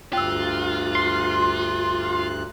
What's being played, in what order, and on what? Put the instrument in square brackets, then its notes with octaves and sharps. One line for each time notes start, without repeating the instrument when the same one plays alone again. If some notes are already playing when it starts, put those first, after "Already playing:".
[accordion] D2 G2 F#6 [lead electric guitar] F4 [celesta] G5 E6
[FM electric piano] C6